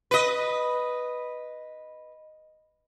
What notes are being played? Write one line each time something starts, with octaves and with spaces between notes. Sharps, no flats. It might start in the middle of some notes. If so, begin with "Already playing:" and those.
B4 D#5